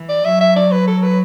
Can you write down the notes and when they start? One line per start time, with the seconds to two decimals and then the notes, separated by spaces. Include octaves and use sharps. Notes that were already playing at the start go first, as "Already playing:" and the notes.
Already playing: E3
0.09 D5
0.25 F#3 E5
0.40 E5
0.56 D5
0.72 B4
0.87 A4
1.03 B4